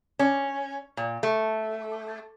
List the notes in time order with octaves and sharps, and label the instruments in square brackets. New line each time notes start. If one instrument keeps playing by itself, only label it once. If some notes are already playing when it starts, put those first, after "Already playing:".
[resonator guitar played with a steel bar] C#4
A#2
A3